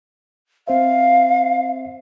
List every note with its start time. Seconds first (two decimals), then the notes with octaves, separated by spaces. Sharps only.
0.68 C4 C5 E5 F5